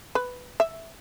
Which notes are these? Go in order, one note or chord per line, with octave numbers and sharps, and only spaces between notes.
B4
E5